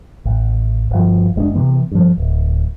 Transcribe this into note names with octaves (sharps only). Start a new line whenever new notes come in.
A1
G1 F3
F#1 G#3 C#4 D4
C3 D#3 E3 B3
G2 F3
D1